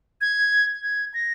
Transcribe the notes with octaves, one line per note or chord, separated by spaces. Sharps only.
G#6
G#6
A#6